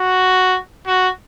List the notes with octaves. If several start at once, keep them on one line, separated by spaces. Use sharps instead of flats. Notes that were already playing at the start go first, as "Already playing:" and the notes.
Already playing: F#4
F#4